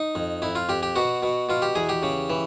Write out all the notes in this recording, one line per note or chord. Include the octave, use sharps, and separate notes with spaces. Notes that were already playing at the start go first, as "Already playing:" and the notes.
Already playing: D#4
F2
F2 E4
F4
F2 G4
G4
B2 F#4
B2
B2 F4
G4
E2 G#4
G4
C#3
E3